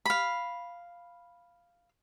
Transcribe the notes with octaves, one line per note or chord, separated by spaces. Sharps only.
F5 B5